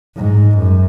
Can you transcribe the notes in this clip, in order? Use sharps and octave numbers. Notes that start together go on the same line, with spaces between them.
G#2
F#2